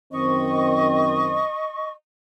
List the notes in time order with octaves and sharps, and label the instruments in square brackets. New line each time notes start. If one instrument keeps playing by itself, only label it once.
[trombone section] F#2 D#3 C4 [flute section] D#5 C#6